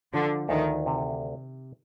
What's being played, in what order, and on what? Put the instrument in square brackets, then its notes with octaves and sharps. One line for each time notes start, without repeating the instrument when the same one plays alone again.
[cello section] D3 [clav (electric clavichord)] F3
[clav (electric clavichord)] D2 [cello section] D#3
[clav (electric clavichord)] C3